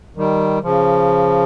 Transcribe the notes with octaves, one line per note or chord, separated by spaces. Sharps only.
D#3 G3
C#3 F3